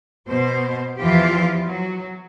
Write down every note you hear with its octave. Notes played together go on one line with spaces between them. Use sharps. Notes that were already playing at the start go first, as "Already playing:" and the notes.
B2 C5
E2 E3 F3 F4 G4
F#3